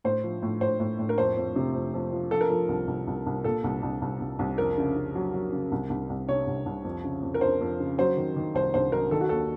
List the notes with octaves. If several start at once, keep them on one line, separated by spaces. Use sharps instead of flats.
A2 C5
F3
A2
A2 C5
A2
A2
A#4
F2 C5
F2
C3
F2
F2
F3
F3 A4
A#4
F3 A4
C2
C2
C2
C2
A#2 A4
C2
C2
C2
C2
C2
F2 A#4
C#3
C#3
F#3
F#3
C#3
C2
C2
C2
C3 C#5
C2
C2
F2
C#3
F2
A#4
F2 C5
F2
C#3
F#3 C5
D#3
D#3
C2 C5
C2 C5
F#3 A#4
D#3 A4
F#4
D#2 A4